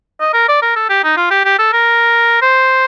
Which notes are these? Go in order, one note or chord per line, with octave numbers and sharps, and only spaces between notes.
D#5
A#4
D5
A#4
A4
G4
D#4
F4
G4
G4
A4
A#4
C5